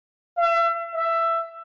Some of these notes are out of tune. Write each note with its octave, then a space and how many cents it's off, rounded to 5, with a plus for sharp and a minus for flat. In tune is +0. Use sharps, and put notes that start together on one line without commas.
E5 +35
E5 +15